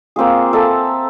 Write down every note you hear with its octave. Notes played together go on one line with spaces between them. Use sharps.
A#3 C4 F4 G#4
A4 E5 A5 A#5